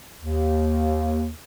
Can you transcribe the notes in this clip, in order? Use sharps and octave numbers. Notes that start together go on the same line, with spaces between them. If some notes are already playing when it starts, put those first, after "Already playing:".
D#2